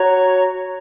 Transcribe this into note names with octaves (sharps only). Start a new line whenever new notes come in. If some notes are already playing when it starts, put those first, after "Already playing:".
Already playing: F#4 C#5 A#5 C#6